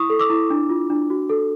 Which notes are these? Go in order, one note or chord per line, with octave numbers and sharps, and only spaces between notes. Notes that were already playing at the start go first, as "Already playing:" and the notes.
Already playing: E4 C#6 D#6
A4
D6 E6
E4
D4
F4
D4
F#4
A4